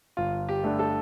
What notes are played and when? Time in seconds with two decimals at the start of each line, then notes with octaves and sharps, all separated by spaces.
0.17 G1 F4
0.49 G4
0.64 G2 D3 A3
0.79 A4